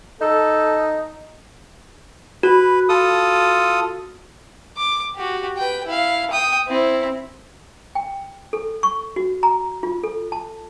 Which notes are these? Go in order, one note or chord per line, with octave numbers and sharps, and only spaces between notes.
D#4 A4
F#4 B4
F4 A4 D#6
D6
F#4 G4
B4 G5
E4 F5
G5 D#6
C4 E4
G5
A4
C#6
F#4
A#5
F4
A4
A5